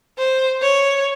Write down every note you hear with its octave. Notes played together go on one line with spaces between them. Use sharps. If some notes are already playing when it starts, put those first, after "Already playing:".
C5
C#5